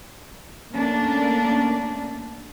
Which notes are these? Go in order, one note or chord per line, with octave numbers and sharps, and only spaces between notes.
A3 A#3 C#4 D4